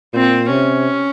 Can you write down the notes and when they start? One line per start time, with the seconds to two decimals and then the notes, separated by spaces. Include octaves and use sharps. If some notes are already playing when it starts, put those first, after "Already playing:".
0.14 A#2 C4
0.50 C3 C#4